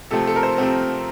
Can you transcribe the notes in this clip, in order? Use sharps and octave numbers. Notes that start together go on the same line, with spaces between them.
C3 F3 A3 C4 A4
A4
A#4
C5
C3 F3 A3 C4